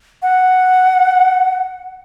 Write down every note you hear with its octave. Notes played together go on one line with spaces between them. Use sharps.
F#5